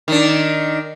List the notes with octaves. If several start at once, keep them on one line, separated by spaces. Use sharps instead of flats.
D#3 D4